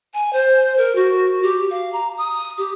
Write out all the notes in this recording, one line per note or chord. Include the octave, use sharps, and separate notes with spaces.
G#5
C5
A#4
F#4
G4
F5
A#5
D#6
G4